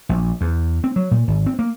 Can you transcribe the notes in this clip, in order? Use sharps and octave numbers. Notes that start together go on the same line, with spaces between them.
A#1
E2
C4
F#3
A#2
G#1
C4
A#3